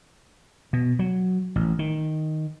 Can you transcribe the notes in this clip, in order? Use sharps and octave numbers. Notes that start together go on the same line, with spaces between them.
B2
F#3
A1
D#3